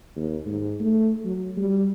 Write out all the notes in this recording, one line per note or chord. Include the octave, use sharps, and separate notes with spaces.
D#2
G#2
A3
F#3
G3